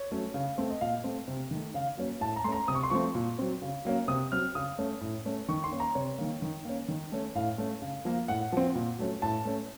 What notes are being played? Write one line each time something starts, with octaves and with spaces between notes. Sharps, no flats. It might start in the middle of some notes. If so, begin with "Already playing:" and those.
Already playing: C#5
F#3 A3 C#4
C#3
A3 C4
D#5
A#2 F5
A3 C4
C3
D#3 A3
C#3 F5
F#3 A#3 C#4
A2 A5
A#5
A3 C#4 A#5 C6
C3 D#6
C#6
C6
F3 A3 C4 C#6
A#2
F#3 C4
C#3
F#3 A#3 C#4
C3 D#6
F#3 C4 F6
C#3 D#6
A3 C#4
A2
A3 C#4
D#3 C#6
C6
A#3 C#4
A#5
C3 C#5
D#3 A#3
D#3
A#3 C#4
D#3
A3 C#4
A2 F5
A3 C#4
C#3
F3 A#3
A2 F#5
F3 C4
A#2
F#3 A3 C#4
A2 A5
A3 C#4